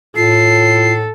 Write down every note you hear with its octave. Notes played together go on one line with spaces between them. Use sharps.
A2 F4 A4 C7